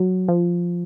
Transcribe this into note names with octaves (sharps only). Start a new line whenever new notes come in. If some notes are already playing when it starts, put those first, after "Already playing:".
Already playing: F#3
F3